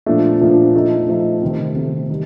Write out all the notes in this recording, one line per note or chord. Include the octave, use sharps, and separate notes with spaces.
A#2 F3 A3 D4
A#2 F3 A3 D4
F3 A3 D#4
F3 A3 D#4
C3 D#3 A3 C4
C3 D#3 A3 C4
D#3 G3